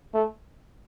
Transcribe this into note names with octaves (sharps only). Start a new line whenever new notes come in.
A3